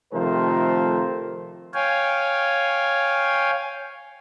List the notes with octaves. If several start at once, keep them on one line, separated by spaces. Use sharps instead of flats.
C3 D#3 F3 A3 A#4 C5
C#5 F5 G5 G#5